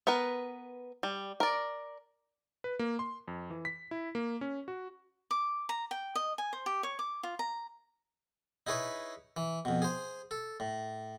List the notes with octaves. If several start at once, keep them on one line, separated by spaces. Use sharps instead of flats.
B3 A#4 B4
G3
A#4 D5
B4
A#3
C6
F2
E3
B6
E4
A#3
C#4
F#4
D6
A#5
G5
D#5
G#5
C5
G4
C#5
D6
F4
A#5
D#4 E4 G#4 B4 C#5
E3
F2 B2
G#4 C5
A4
A2